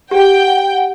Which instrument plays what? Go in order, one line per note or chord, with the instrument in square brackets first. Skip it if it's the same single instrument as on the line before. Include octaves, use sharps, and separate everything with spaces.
[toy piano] G4 [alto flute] F#5 [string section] G5